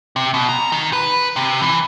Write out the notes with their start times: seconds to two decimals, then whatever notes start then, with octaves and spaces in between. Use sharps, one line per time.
0.16 C3
0.34 B2
0.49 A#5
0.72 D#3
0.93 B4
1.36 C3
1.62 E3